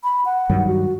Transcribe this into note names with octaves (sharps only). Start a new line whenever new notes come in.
B5
F#5
G2 D#3 F#3
F#4